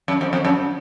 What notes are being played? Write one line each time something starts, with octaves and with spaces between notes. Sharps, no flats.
F#2
F2
F2
F#2